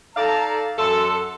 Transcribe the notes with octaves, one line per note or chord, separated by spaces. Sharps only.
D#4 A4 D5 F5 A5 A#5
F#2 A4 C6